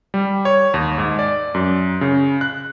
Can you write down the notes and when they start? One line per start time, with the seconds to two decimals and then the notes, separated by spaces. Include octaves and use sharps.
0.14 G3
0.45 C#5
0.74 D#2
0.98 G#2
1.19 D5
1.54 F#2
2.01 C#3
2.41 F#6